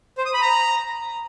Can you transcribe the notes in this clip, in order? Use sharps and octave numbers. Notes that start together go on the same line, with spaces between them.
C5
D#6
B5
A#5